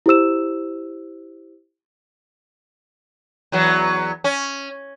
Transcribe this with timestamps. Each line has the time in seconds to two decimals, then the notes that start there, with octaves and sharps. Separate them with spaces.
0.06 E4 G4 C5 E6 E7
3.52 E2 F#3 B3
4.24 C#4